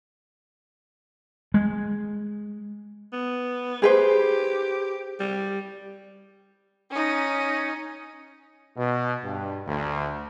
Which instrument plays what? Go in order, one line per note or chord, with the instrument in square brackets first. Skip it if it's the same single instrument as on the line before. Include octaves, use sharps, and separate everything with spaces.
[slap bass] G#3
[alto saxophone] B3
[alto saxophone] G4 [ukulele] G#4 B4 C5
[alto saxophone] G3
[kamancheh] C#4 D#4
[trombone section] B2
G2
D2